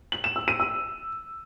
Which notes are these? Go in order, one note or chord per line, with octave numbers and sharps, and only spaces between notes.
F#7
E7
E6
D#7
E6